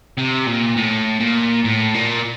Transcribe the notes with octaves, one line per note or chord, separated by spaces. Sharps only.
C3
A#2
A2
A#2
A2
A#2